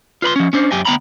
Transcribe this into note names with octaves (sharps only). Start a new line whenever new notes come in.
F4 B4 B5 C6
F3 C#4
C#4 D4 C5
F#2 G4 G5 G#5
D2 B3 G5 A#5 B5